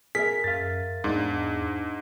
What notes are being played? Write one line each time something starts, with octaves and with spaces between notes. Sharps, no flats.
G#4 A#4 E5 B6
F#2 F5 A6
E2 G#2 D4